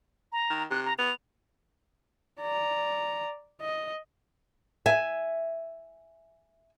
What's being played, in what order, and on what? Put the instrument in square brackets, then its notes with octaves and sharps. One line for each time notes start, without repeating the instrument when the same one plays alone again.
[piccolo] A#5
[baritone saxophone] D#3
[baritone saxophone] C3 [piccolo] F#6
[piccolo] A#5
[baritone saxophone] B3 [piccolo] F7
[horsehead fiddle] D5 A#5
D#5
[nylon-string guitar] E5 G#5